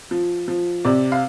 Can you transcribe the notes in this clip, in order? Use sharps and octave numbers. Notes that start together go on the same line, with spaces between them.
F3
F3
C3 D5
F5